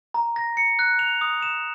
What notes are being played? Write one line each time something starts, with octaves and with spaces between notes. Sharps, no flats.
A#5
A#6
C#7
F#6
F7
D#6
E7